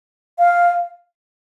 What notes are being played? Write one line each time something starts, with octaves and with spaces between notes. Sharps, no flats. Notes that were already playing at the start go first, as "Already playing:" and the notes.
F5